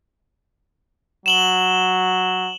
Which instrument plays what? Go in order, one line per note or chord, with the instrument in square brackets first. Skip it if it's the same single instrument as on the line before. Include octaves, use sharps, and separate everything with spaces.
[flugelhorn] F#3 [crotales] E7 F#7 G7